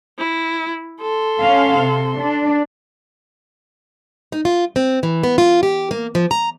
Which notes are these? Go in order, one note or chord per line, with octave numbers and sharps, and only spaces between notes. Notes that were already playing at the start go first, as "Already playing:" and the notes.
E4
A4 C6
C#4 F5
C3
D4
D#4
F4
C4
E3
B3
F4
G4
A#3
F3
A#5